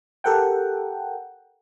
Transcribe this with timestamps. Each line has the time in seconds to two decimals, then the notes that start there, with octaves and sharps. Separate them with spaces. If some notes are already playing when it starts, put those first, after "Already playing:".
0.24 G4 A4 A#4 F#5 G5